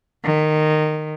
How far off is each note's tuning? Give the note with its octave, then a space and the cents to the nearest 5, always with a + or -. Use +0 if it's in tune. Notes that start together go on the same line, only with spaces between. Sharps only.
D#3 -15